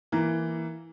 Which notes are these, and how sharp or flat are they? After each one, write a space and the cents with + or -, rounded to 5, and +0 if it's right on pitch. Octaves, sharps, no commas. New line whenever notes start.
E3 +0 A#3 +0